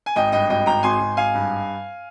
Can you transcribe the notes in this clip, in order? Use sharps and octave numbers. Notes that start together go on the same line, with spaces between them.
G#5
G#1 D#5 G5
G2 D#5 G5
G#1 D#5 G5
G#1 G5 A#5
G#1 G#5 C6
G#1
G#1 F5 G#5
G2